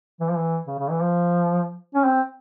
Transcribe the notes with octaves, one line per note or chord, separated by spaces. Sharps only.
E3
F3
E3
C#3
C#3
E3
F3
C#4
C4